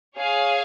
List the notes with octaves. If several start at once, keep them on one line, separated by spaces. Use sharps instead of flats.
G#4 C#5 F5 G#5